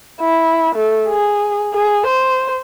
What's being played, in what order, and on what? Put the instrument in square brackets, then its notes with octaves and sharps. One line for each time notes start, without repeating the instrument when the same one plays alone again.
[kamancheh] E4
A3
G#4
G#4
C5